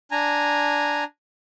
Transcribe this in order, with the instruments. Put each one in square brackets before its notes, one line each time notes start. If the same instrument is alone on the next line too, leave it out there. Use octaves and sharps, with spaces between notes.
[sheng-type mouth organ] D4 G#5 A#5